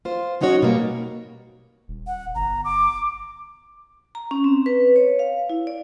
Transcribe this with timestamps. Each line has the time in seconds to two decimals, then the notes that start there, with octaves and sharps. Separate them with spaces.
0.05 F4 C5
0.41 F#3 C#4 D#4 F#4 C#5
0.62 B2 G3 A#3
1.88 D#1
2.07 F#5
2.35 G1 A#5
2.64 D6
4.15 A#5
4.31 C#4
4.44 C4
4.66 B4
4.96 C#5
5.19 F5
5.50 E4
5.67 D5